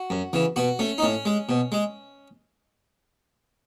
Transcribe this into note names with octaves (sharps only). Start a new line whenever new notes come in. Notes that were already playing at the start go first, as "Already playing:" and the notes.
Already playing: F#4
F#2
C#3 E3
B2 F#4
A3 C#4
D#4
A2 C#4
G#3
B2
G#3